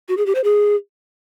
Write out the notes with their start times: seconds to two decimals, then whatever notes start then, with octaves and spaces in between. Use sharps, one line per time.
0.08 F#4
0.17 G#4
0.26 G4
0.35 C5
0.44 G#4